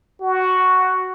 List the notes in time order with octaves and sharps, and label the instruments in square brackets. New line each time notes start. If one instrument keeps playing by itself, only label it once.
[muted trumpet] F#4